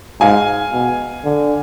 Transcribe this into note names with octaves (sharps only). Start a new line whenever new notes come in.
G#2 F5 G#5
B2
D3